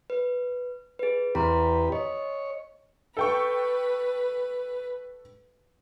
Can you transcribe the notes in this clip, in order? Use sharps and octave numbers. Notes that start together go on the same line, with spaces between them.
B4
G#4 B4
E2 C4 G4 B4 A#5 C6
C#5 D#5
A4 B4 G5 C#6